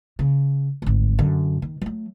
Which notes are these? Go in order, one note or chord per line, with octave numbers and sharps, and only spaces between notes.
C#3
G#1 D2
F#2 D3
D#3
F#3 A3